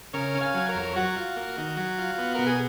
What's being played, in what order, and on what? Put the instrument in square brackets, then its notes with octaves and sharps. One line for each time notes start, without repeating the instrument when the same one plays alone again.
[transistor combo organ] C#3 A#4 C#5
C#4
F5 G#5
F#3
A#4 C#5
F2
F#3 F#4
F4
A#3
D#3
F#3
F4
B3
B2 A#4
G#4